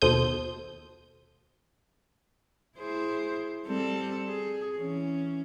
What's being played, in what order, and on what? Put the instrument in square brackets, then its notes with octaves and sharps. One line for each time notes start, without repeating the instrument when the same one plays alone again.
[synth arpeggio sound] D#2 B2 A4 C5 D#6 G6
[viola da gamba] E4 G#4 C5
G3 C4 A4
G#4
E3 C#4